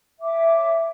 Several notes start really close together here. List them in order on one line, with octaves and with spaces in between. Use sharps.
E5 D6 C#5